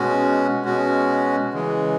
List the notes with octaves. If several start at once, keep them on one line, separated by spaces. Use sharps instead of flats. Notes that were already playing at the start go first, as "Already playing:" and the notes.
Already playing: B2 G#3 C#4 F#4
B2 G#3 C#4 F#4
C#3 E3 G#3